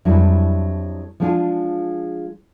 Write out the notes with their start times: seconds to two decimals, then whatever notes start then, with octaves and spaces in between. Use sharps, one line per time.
0.05 F2 F#3 G3 D4 E4
1.20 F3 G#3 B3 D4 F4 G#4